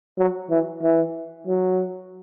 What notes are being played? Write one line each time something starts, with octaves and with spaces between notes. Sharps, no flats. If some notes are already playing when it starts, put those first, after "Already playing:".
F#3
E3
E3
F#3